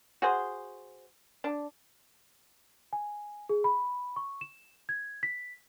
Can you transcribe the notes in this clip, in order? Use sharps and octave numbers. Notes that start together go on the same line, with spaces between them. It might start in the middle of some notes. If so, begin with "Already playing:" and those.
F#4 G#4 C5
D4
G#5
G#4
B5
C#6
E7
G#6
B6